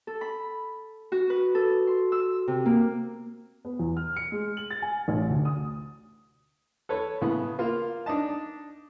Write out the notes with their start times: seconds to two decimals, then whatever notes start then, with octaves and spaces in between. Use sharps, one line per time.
0.07 A4
0.21 B5
1.12 F#4
1.30 B4
1.55 A4
1.87 C6
2.12 E6
2.48 C3
2.66 A#3
3.65 B3
3.79 E2
3.97 F6
4.16 C#7
4.32 G#3
4.57 F#7
4.71 A6
4.82 G#5
5.08 A1
5.30 D2
5.45 D#6
6.89 A4 B4 C#5
7.21 A2 C#3 B3
7.59 A#3 F4
8.06 D4 D#4 D#5 A5